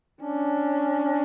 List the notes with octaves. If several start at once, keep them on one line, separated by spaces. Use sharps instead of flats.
C#4 D4